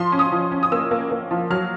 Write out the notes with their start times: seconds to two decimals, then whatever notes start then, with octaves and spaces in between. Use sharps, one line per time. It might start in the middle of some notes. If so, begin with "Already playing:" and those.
Already playing: F3 C6
0.12 C#4
0.19 D#6
0.32 F3
0.52 C#4
0.63 D#6
0.72 A#3 E6
0.91 A#3
1.11 A#3
1.31 F3
1.50 F#3 F6